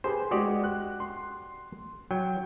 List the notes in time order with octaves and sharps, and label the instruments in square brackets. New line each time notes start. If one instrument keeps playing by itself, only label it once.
[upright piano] G4 G#4 B4 [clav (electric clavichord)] C5
[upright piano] G#3 D#6 [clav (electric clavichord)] F#4 G4 D5
[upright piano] F#6
C6
[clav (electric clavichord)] F#3 [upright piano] G5